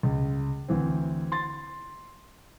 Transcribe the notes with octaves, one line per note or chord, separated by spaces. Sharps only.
C#2
D2 E3 C4
C6 A6